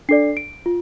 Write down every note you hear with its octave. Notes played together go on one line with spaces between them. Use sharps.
D4 A4 D5 C7
D7
F4